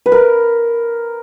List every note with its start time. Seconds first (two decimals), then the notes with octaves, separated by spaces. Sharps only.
0.06 B4
0.12 A#4